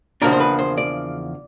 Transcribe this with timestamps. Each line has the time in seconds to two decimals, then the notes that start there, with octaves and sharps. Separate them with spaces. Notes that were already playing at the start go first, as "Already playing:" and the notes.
0.22 E2 C#3 F3 A#3 D4 A#4
0.32 C5
0.40 B4
0.59 C5
0.78 D5